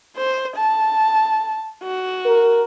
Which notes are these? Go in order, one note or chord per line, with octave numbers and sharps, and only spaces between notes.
C5
A5
F#4
A#4